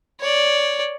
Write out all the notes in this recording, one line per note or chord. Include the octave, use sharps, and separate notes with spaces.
C#5 D5